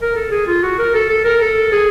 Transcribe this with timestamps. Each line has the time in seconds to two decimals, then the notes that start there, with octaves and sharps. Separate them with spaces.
0.02 A#4
0.15 A4
0.31 G#4
0.47 F4
0.62 F#4
0.78 A#4
0.94 A4
1.09 A4
1.25 A#4
1.41 A4
1.72 G#4